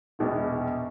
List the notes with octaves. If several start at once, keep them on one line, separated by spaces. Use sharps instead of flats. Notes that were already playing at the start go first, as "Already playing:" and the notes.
E1 A#1 B2 B3